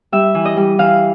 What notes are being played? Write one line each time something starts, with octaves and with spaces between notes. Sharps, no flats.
G3 E5
E3
D#5
G3
E3 F5